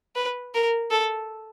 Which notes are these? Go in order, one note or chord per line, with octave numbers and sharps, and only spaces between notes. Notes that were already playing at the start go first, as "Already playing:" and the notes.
B4
A#4
A4